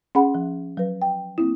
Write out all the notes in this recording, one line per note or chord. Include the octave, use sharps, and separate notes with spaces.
C#4 G#4 F#5 B5
F3
F#3 B4
G5
A#3 C4 E4